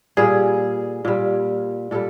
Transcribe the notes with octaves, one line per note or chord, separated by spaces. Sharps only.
A#2 G3 G#4
A#2 G3
A#2 G3 A4